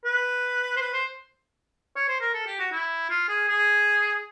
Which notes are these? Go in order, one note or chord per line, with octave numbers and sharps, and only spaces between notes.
B4
C5
B4
C5
C#5
C5
A#4
A4
G4
F#4
E4
F4
G#4
G#4